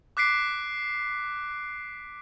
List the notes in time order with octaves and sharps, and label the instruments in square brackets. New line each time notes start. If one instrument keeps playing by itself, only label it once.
[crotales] D6 F#6 B6 C7 D7